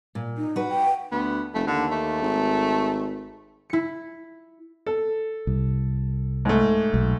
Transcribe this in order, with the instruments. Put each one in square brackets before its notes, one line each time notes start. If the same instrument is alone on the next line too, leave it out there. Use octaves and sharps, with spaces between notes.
[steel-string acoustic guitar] A#2
[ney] D#4
[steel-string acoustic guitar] F#4 B4
[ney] G5
[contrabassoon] D2 [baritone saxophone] B3
[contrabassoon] F1 [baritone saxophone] A3
[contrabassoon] D#2 [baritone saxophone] D3
[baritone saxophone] A3
[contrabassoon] G#1
[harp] E4 C#7
[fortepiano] A4
[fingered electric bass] C2
[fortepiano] G#2 A3
[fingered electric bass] B1